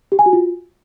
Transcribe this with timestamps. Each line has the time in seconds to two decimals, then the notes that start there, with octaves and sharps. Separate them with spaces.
0.12 G4
0.19 G#5
0.26 F#4
0.33 F4